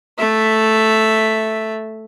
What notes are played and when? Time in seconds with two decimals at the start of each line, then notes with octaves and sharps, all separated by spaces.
0.19 A3 E5